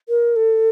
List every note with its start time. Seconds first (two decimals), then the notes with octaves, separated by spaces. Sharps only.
0.08 A#4
0.36 A4